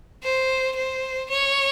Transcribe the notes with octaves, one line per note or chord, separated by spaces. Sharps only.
C5
C5
C#5